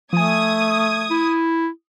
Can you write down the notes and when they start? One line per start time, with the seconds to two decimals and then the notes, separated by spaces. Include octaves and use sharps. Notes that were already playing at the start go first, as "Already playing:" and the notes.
0.13 F3 A3 G#5 D#6 G#6
1.11 E4